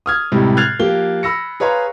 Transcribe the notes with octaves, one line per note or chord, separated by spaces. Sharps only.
D#6 F6 G#6
A2 C3 G3 G#3
F6 F#6 G#6 A6 C7 F7
F3 A#3 G4 G7
B5 E6 A#6 C#7
G#4 B4 C#5 F5 A#5 C6